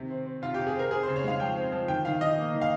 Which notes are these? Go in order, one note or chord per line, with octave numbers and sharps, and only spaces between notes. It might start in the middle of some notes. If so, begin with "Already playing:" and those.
Already playing: C3 D#3
C4
C4
C3 F4
C3 G4
G#4
C4 A#4
C4 G#4
C#3 C5
C#5
G#3 F5
F3 G5
C4
F3
D#3 G5
D#3 F5
D#3 D#5
A#3
D#3
F5